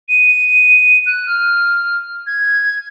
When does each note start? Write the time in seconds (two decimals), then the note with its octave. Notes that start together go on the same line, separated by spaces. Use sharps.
0.09 D#7
1.06 F#6
1.26 F6
2.27 G#6